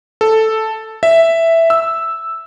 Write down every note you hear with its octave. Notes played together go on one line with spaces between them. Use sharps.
A4
E5
E6